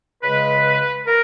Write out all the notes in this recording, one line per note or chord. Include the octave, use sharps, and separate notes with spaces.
C#2 C#3 G#3 B4
A#4